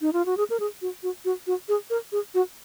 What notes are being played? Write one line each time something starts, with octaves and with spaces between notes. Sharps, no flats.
D#4
F4
F#4
G#4
A#4
G#4
F#4
F#4
F#4
F#4
G#4
A#4
G#4
F#4